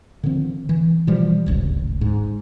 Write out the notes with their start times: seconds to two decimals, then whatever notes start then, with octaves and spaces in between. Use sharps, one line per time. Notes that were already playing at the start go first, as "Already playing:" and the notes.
0.23 D3 D#3 F3 C4
0.69 E3
1.07 B2 E3 F3 G3
1.46 D1 G#1 C#2
2.01 G#2